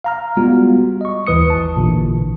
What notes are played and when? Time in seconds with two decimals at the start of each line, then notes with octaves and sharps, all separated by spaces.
0.04 F5 A#5 F6
0.37 G3 G#3 B3 F4 F#4
1.01 D#5 C#6
1.27 D#2 E3 B4 D#6 C#7
1.50 G#1 A5
1.76 A1 A#2 D3 E3